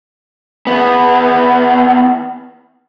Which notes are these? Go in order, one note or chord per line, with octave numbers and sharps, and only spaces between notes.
E2 B3